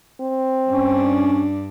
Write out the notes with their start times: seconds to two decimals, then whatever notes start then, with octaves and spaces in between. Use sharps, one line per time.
0.21 C4
0.71 G2 C#4 D4